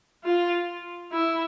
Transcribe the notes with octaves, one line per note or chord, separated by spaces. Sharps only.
F4
E4